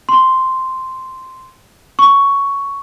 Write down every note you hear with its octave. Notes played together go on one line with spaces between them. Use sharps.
C6
C#6